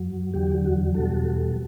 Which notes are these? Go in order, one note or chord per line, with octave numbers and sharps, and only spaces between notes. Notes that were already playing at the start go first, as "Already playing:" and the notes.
Already playing: F#2 F#3
E2 D3 F#3 G4
F#4
E2 B2 G3 F#4 A4